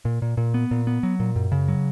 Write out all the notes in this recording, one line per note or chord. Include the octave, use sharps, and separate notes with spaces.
A#2
A#2
A#2
B3
A#2
B3
F#3
A#2
F#2
C#3
F#3